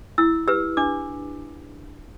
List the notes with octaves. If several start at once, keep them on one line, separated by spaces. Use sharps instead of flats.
E4 E6
G4 B4 E6
D4 D6